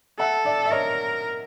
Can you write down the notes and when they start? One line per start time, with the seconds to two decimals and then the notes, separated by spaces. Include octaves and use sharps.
0.19 A4 E5 F#5
0.45 D5 E5
0.66 E5
0.71 A#4 C#5 D#5